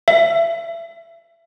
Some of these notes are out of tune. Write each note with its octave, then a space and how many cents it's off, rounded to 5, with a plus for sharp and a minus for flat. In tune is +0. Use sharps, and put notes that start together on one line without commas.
E5 +30